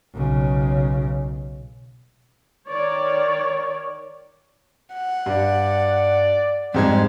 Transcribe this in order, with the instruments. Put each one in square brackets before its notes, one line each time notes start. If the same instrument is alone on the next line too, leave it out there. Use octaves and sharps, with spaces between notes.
[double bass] B1 C#3
[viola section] D#3 C#5 D5
[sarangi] F#5
[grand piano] G2 [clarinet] D5
[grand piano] F2 G#2 G#6 [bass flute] G3 [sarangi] C5